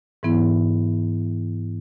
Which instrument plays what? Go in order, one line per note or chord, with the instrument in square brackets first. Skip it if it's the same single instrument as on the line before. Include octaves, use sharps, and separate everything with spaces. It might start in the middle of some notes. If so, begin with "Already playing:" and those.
[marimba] G#2 E3 B3 E4